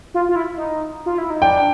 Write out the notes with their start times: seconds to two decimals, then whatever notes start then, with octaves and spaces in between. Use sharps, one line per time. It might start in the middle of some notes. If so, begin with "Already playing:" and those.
0.14 F4
0.29 F4
0.36 E4
0.57 D#4
1.06 F4
1.18 E4
1.30 D#4
1.42 D4 G5